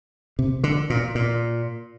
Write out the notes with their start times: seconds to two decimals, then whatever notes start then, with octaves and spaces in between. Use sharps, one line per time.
0.39 C3
0.64 D3
0.90 A#2
1.15 A#2